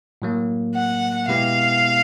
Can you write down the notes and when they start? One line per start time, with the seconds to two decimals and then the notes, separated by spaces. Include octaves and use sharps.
0.22 A2 F#3 A#3
0.75 F#5
1.28 B2 G#3 B3 E4 G4 F5